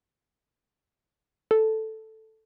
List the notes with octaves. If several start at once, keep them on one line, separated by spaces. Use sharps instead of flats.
A4